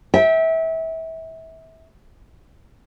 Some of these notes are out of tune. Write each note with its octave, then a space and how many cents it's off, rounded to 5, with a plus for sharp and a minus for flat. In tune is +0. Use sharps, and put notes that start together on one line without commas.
E5 -25 G5 +0